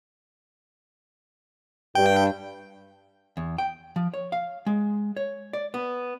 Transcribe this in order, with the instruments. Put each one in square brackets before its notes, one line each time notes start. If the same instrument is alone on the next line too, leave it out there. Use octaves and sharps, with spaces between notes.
[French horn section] G2 [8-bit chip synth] G5
[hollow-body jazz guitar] E2
G5
F3
C#5
F5
G#3
C#5
D5
B3